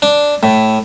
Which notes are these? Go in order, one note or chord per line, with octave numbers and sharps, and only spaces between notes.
D4
A2